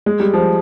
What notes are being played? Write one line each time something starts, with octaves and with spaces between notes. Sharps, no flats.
G#3
G3
F3